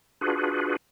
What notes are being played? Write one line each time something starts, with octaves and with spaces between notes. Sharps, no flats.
D4 F4 F#4 G#4 B4